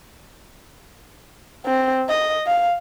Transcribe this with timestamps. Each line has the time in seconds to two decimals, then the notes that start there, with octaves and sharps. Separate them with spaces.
1.66 C4
2.09 D#5
2.47 F5